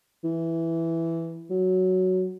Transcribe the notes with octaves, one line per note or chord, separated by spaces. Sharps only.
E3
F#3